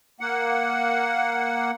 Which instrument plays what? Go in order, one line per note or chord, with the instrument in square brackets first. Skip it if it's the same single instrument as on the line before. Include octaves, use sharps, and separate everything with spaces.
[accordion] A#3 F#5